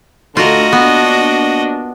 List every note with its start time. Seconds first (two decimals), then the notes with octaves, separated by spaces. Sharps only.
0.37 D3 A3 F4 F#4 A#4 D#5
0.72 A#3 B3 D4